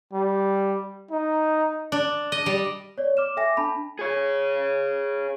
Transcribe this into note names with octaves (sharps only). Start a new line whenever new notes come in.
G3
D#4
D4
D#5
G3
C#5 D5
D6 F6 E7
A4 E5 G5 G#5 D6 A#6
D4 A5 B5
G#4 C#5